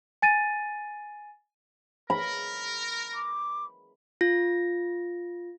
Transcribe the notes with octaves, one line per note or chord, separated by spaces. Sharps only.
G#5 A6 D#7
A#4 B5
D6
F4 A#6